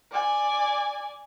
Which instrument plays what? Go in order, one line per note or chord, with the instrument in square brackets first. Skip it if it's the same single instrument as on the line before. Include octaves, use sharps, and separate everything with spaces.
[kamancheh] D5 G#5